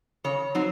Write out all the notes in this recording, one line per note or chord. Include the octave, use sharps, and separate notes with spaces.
C#3 C#5
F#3 C4 D#4